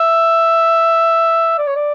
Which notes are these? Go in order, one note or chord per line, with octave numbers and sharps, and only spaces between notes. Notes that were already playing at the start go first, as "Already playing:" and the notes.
Already playing: E5
D5
C#5
D5